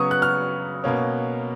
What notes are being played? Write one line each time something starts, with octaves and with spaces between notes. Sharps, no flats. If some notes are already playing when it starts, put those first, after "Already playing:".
Already playing: C#3 F#3 B3 C#6 D#6
F#6
F6
B2 A#3 C#4